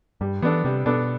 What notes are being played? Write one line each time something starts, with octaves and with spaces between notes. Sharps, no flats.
G2 G3
E3 B3 D4 A4
C3 G3
B2 B3 D4 A4